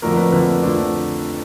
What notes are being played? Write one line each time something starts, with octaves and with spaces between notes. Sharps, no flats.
F2 D3 F3 A3 D4 A#4
B4
F2 D3 F3 A3 D4 B4
F2 D3 F3 A3 D4